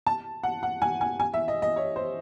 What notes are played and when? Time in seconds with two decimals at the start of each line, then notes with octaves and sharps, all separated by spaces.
0.07 A5
0.43 F#5
0.63 F#5
0.82 G#5
1.01 G#5
1.20 G#5
1.34 E5
1.48 D#5
1.62 D#5
1.76 C#5
1.96 C5